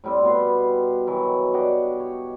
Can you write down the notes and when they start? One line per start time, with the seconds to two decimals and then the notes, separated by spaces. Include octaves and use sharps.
0.04 A2 G3 C4
0.23 B2 B3 C6
1.07 D#3 E3 F#3
1.54 D4 G4 D#5 F#5
2.00 C#5